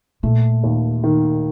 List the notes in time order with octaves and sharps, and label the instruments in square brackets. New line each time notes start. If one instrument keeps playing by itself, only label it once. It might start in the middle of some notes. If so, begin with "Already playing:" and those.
[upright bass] A#2 [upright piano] A3
[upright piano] D#2
D#3